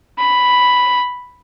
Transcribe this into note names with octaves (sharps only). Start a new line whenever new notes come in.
B5